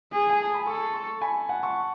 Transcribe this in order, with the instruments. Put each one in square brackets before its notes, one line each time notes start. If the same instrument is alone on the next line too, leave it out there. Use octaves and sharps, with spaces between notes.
[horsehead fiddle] G#4
[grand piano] G#5
A5
B5
[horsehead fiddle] A4 [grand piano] A5 C#6
[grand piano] A5 C#6
G#5 B5
F#5 A5
A5 C#6